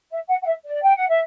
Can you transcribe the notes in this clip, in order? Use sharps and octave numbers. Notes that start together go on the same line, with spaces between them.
E5
F#5
F#5
E5
D5
G5
F#5
E5